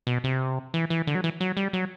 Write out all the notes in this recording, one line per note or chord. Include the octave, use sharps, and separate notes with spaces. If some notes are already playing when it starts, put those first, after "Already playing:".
B2
C3
E3
E3
D3
F#3
E3
F#3
G3
F#3